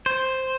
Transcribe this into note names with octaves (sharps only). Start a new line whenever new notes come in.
C5